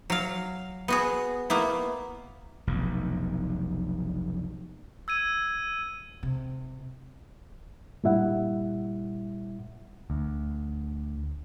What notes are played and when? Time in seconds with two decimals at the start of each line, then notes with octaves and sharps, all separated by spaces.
0.10 F#3 F5
0.88 B3 F#4 G#4
1.50 A#3 B3 E4
2.67 F1 B1
5.08 E6 G#6 D#7
6.23 C3
8.04 G2 A#2 G3 E4 E5 F#5
10.10 D2